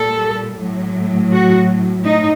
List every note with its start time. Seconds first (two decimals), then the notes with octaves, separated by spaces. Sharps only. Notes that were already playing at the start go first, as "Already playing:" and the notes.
Already playing: A#2 G3 A4
0.59 A2 F#3
1.32 F#4
2.04 A2 D#4